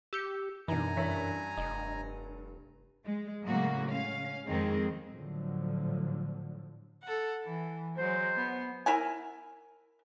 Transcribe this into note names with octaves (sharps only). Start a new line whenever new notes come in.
G4 E6 G6 C#7
F#2 B2 E3 D4 D#4 G#5 A#5
G2 E3 D4 C#5 E5 B6
F1 D#5
G#3
A2 C#3 F#3 G#3 A#3 F#4
C#4 F5
F2 D#3 F3 G#3 C4 G#4
A2 D3 F3 F#3
A4 F#5
E3
F#3 G#3 C5
B3
E4 A#4 G#5